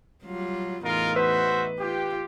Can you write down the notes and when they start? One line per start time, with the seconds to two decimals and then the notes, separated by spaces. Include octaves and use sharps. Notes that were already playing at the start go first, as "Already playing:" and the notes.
0.25 F#3 G3 F4
0.84 E2 A2 D#4 F4 A#4
1.16 F#4 B4 C5 E5
1.79 F4 G4